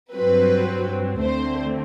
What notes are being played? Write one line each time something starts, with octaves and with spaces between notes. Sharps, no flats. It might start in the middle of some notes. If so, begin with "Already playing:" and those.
G2 F#3 C4 B4
D2 D3 A3 C4 C5